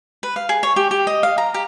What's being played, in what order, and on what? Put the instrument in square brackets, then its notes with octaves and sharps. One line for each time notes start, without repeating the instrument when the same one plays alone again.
[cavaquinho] B4
F5
G#4
C#5
G4
G4
D#5
F5
A#5
G4